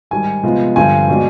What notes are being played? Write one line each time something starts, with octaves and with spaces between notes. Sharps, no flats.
G#2 D#3 G3 G#5
C3 F3 G#3 B3 F4
G2 D3 F3 C4 G#5
B2 G#3 D4